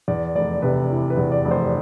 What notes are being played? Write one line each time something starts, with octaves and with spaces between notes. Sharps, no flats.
E2 D5
F1 D5
C3 B4
E3
B4
E2
D5
F1
C5